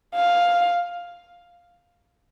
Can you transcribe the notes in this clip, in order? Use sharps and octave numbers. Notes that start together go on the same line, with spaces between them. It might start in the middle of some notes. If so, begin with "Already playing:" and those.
F5